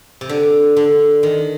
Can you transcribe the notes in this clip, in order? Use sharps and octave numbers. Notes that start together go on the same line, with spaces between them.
C3
D3
D3
D#3